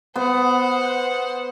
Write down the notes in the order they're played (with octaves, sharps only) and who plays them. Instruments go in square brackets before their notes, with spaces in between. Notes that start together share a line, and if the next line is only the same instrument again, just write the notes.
[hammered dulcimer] B3 [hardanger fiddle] C5 F#5